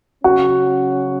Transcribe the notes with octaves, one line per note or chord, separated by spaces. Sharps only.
C#3 F#3 C#4 F#4 F#5